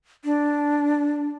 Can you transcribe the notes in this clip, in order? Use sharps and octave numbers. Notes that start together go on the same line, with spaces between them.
D4